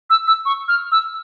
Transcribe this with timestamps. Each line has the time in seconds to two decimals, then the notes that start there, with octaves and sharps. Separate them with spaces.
0.10 E6
0.27 E6
0.45 C#6
0.68 F6
0.92 E6